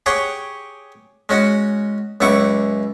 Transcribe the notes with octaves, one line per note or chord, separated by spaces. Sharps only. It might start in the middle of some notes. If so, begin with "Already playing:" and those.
G4 G#4 C#5 F#5 G5
G#3 C#4 F#4 F#5
C#2 F#2 E4 F#5 C#6 D6